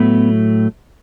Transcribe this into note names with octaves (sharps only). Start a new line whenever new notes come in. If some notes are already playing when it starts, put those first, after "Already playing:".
Already playing: A2 F#3 A3 B3